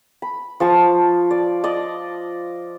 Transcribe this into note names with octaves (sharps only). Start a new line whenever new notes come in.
B5
F3 A5 C#6 D#6
D5
D5 D#5